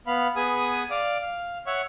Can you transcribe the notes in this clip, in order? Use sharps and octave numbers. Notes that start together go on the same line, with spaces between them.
B3 F5 B5
B3 G#4 B4 G#5 D#6
D5 F5 D6
F5
C#5 E5 F#5 C#6